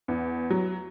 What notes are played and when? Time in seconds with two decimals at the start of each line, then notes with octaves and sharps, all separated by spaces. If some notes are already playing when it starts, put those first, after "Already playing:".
0.08 E2
0.50 F#3